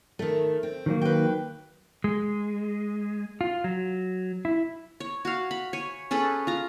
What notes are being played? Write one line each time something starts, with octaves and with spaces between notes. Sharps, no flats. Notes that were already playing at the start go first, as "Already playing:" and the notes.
D#3 A3
C4
D#3 F#3 A#3
B4 G5
G#3
F4
F#3
E4
C#5
F#4 F5
B5
C#5 G#5
C#4 G#4 A4 B4
F4 A#5